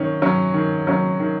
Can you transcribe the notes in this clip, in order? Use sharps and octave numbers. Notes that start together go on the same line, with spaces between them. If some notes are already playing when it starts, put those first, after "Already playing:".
Already playing: D#3 F#3 C#4
F#3 C#4
D#3
F#3 C#4
D#3